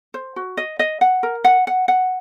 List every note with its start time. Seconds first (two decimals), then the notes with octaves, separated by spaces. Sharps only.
0.14 C5
0.36 F#4
0.57 D#5
0.79 D#5
1.01 F#5
1.23 A#4
1.44 F#5
1.67 F#5
1.88 F#5